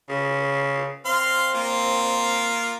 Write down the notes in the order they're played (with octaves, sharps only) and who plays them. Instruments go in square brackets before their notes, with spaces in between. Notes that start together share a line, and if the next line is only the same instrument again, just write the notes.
[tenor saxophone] C#3
[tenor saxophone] C4 [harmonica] F5 C6
[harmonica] A#3 F4